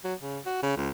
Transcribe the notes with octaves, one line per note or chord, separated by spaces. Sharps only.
F#3
C#3
F#4
C#3
C#2